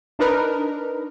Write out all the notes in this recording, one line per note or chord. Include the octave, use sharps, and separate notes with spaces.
D4 D#4 A#4 B4